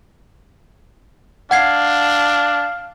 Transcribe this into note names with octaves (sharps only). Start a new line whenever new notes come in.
D4 F5 F#5 G#6 C7